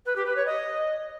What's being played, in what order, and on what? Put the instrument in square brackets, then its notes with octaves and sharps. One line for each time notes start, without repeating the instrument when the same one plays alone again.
[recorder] B4
G4
B4
C#5
D#5